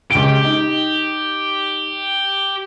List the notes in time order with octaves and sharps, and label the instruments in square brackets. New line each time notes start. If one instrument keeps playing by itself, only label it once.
[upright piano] C#2 D7 [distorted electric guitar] G4
[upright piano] D#4